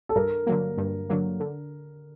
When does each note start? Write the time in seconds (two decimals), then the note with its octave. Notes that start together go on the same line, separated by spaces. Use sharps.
0.09 A4
0.16 G2 A#4
0.47 D3 F#3 A#3
0.78 G2
1.09 D3 F#3 A#3
1.40 D3